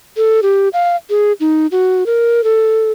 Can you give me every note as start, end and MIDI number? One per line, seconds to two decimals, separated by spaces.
0.17 0.40 69
0.43 0.69 67
0.73 0.96 77
1.10 1.32 68
1.40 1.67 63
1.72 2.06 66
2.06 2.43 70
2.44 2.92 69